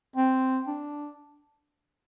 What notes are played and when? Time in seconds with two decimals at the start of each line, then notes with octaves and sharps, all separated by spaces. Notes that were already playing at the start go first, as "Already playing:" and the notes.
0.16 C4
0.67 D4